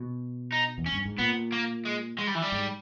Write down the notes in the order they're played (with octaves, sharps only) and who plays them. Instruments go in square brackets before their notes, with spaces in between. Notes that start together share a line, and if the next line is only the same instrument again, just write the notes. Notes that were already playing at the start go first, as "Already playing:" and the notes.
Already playing: [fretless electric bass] B2
[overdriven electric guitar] D#4
[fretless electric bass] E2
[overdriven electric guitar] C#4
[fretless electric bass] G2
G#2
[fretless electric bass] A#2 [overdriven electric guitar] B3
[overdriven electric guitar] A#3
G#3
G#3
G3
E3
G3
[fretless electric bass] G#2